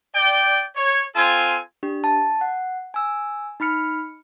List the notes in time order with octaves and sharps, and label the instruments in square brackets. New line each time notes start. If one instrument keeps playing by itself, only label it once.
[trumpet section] D5 G5
C#5
C4 F4 A4 G#5
[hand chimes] D4 G4
A5
F#5
G#5 E6
D#4 B5 F6 C#7